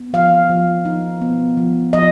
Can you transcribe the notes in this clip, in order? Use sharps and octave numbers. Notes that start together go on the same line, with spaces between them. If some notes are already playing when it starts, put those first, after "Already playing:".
Already playing: B3
F3 F5
F3
D#4
B3
F3
F3 D#5